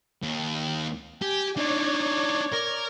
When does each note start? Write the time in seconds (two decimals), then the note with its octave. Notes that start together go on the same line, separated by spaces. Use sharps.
0.23 D#2
1.22 G4 G5 G#5
1.57 D4 D#4 C#5 D5
2.52 A#4